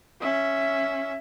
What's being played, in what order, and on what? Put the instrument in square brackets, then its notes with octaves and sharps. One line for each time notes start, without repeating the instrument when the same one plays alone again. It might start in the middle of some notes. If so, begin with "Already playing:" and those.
[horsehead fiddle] C#4 E5